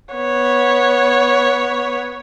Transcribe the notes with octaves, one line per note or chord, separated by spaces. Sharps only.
B3 C#5